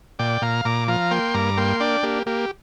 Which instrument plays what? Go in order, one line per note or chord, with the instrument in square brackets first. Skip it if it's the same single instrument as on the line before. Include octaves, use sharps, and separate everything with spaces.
[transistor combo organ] A#2 D5 G5
A#2 F5 A#5
A#2 A#5 D6
F3 F5 A#5
A#3 G5 C6
G2 A#5 D6
A#3 G5 C6
D4 D5 G5
A#3 G4
A#3 G4